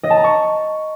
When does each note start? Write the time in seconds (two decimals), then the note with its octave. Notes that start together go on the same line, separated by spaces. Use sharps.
0.03 D#5
0.10 A5
0.17 A#5
0.24 C#6